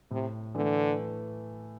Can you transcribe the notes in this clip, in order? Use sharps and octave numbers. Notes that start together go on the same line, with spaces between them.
A2 C3
D3 E3 A3